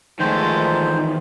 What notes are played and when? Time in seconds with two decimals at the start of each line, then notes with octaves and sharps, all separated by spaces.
0.20 E2 D#3 F3 G#3 A3 D#4 C5